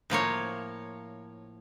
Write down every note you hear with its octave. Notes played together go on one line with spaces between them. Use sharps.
A2 F3 A#3 C#5